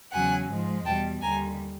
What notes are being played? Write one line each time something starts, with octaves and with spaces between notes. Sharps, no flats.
E2 C#3 F#3 F#5 G#5
G#2 F3 G#3
E2 B2 G3 G5 A5
D#2 D3 G3 G#5 A#5